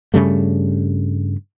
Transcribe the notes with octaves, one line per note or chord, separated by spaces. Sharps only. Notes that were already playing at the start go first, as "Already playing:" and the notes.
G2 C#3 G3 A3